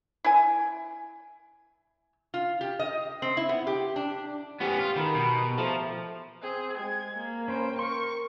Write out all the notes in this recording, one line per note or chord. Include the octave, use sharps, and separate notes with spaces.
E4 G#5
F4
G4
D#5
C4
E4
B3
G4
D4
B3 C#4 G4 D6
F4
D#3 A#4 B5
B2
F3 A3 A#4
C4 G#4
G#3 G#6
A#3
C#4 B4 C5 G5
A#4 C6 C#6